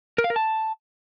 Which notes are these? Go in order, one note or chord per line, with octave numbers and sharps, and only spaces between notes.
A#4
F5
A#4
A5